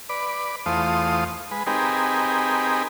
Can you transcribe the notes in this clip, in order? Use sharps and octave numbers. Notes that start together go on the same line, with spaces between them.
B4 D5
E2 A3 F4 C5 D#6
G#3 B4
C4 D#4 G4 G#4 A#4 B4